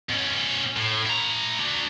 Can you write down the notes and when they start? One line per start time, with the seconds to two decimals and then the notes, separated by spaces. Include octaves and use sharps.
0.09 B2 C#4
0.76 A2
1.06 E4 A#5
1.59 D4 F#4